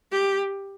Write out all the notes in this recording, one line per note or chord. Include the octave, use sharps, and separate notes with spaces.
G4